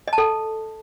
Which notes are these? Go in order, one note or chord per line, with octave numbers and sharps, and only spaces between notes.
D#5
A5
A4